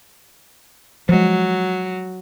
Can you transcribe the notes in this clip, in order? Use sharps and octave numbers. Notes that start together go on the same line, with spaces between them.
F3 F#3 G#3